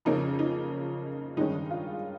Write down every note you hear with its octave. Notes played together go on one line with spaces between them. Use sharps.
F2 C#3 F3 A#3 C#4 D#4
D#4
G2 D#3 G#3 C#4 D#4
F4